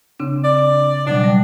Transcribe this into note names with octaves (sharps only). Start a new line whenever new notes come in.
C#3 C4 D4
D5
B2 F#3 G3 D4
G3